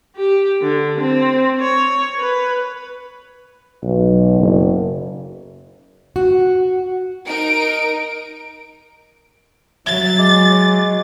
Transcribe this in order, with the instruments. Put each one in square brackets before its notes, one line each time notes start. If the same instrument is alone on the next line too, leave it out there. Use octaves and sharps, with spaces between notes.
[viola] G4
D3
C4
C#5
B4
[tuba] B1
F#1
[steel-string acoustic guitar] F#4
[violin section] D#4 A#4 D7
[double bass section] F#3 [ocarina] E5 [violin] A6
[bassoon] G#3 [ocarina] D6